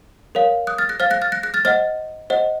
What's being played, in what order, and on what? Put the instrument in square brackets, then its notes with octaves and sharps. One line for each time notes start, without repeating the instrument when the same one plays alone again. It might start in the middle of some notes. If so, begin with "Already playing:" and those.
[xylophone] A#4 C#5 F5
D#6 F#6
F6 A6
F#6 A#6
C5 F5 F6 A6
F#6 A#6
F6 A6
F#6 A#6
F#6 A#6
F6 A6
C5 D#5 F#5 F6 A6
C5 D#5 F#5